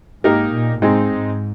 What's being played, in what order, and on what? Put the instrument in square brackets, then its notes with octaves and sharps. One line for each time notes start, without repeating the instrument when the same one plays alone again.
[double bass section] G#2 [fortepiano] A#3 D#4 G4 A#4
[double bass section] A#2
[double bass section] G#2 [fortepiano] G#3 C4 D#4
[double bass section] G#2